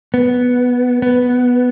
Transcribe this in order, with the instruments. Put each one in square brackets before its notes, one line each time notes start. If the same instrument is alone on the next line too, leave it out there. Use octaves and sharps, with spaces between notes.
[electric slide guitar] B3
B3